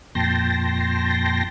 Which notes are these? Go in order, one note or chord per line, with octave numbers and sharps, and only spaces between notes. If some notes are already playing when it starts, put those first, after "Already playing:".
F2 A#2 G5 A5 C6 A#6